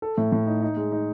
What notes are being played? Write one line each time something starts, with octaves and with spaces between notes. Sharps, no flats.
A4
A2
A2
D#4
D#4
G#3
D#4